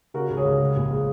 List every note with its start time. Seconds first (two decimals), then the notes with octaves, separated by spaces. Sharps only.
0.14 C#3 F#4 A#4
0.30 C#2
0.37 G#4 C#5
0.45 C#2
0.61 G#3
0.76 A#1
0.91 G#3